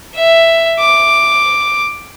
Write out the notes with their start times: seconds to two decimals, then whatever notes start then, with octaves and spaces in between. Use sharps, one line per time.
0.15 E5
0.80 D6